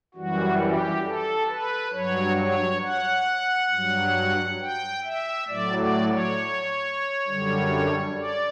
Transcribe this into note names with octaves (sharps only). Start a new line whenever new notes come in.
F#2 E3 G3 F#4
G4
A4
B4
G2 F#3 C#5
C#5
F#5
G2 F#3
G5
E5
A2 F#3 D5
D5
C#5
F#2 D3 G3
D5